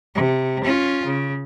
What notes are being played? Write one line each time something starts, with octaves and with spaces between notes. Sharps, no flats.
C3
C#4 F4
C#3